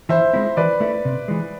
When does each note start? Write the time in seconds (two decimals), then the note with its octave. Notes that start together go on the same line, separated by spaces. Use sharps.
0.09 E3 C5 E5
0.33 G#3 C4 E4
0.57 E3 B4 D5
0.80 A3 E4
1.05 C3
1.28 E3 G#3